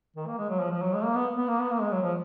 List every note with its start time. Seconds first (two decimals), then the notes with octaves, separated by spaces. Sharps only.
0.16 D#3
0.27 A#3
0.38 G#3
0.49 F#3
0.60 F3
0.71 F3
0.82 F#3
0.93 G#3
1.05 A#3
1.15 B3
1.38 B3
1.48 A#3
1.59 B3
1.70 A#3
1.81 G#3
1.92 F#3
2.03 F3